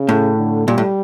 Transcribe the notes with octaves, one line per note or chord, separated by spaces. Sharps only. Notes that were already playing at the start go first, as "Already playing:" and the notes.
Already playing: C#3
A2
D3
A#2 G3
A2